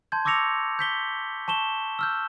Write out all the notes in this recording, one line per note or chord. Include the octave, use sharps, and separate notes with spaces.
A5 C6 G6 G#6
C#6 D6 E6 A#6 C#7 F7
G6 B6 G7
A5 C#6 E7 G7
E6 F6 G6